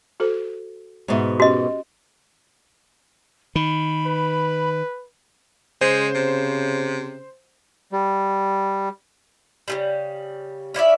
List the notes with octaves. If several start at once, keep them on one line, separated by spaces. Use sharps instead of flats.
F#4 A4 C5
G#2 B2 C5 E5
C#4 F#4 G4 D#5
D#3 B5
B4
C#3 G#3 C5
C3
G3
C#3 E3 G3
C#4 E4 D5 E5